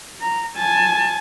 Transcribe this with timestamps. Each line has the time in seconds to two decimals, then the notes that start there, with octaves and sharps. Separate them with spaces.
0.21 A#5
0.56 G#5 A5